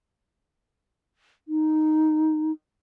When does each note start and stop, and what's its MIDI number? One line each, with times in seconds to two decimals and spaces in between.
1.48 2.52 63